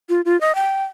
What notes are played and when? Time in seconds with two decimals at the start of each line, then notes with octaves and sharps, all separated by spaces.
0.09 F4
0.25 F4
0.41 D#5
0.55 G5